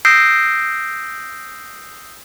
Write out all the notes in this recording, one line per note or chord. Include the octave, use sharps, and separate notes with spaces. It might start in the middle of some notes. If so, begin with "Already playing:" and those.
D#6 E6 G6 A#6 C7 D7